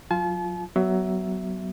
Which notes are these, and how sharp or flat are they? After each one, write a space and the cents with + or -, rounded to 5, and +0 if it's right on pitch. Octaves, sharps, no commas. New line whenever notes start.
F#3 -30 F4 +0 A5 -40
F#3 +20 B3 +0 E5 +0